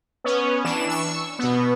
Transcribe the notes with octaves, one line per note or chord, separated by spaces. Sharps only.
B3 C#4
E3 D4 E7
C#6 E6
B2 B3